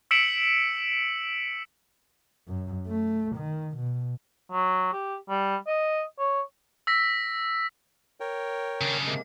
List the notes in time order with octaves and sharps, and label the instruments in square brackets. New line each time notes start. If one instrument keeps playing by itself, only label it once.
[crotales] E6 B6 C#7 D7 E7 F#7
[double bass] F#2
A3
D#3
B2
[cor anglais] F#3
G4
G3
D#5
C#5
[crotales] E6 A#6 B6
[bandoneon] A#4 C#5 G5
[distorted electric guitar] C#3 D4
[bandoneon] C3 G#3 A#3